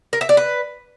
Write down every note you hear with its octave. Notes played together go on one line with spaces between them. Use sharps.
A#4
E5
D5
B4